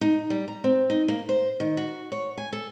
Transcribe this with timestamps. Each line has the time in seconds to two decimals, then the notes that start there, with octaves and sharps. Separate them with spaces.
0.01 D#4
0.30 G3
0.48 A#5
0.64 C4
0.90 D#4
1.08 A#3
1.29 C5
1.60 D#3
1.77 F#4
2.12 C#5
2.38 G#5
2.53 A4